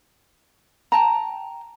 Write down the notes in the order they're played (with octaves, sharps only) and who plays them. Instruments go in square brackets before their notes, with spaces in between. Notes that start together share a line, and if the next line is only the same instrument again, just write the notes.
[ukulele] G5 A5 A#5